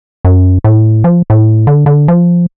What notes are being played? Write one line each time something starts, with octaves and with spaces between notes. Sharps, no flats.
F#2
A2
F3
A2
D3
D3
F3